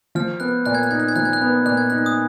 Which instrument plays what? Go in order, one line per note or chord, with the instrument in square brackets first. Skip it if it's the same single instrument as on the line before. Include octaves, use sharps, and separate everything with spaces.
[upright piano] F3 [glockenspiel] F6
[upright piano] B3 [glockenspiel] F#6
[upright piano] A#2 [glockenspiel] F#6
[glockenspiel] G#6
F#6
[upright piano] D#4 [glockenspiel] G#6
[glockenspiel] F#6
G#6
[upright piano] F3 [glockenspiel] F#6
[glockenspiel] G#6
F#6
[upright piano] B3
[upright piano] A#2 [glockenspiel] F#6
[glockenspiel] G#6
[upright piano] D#4 [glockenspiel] F#6
[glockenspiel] D#6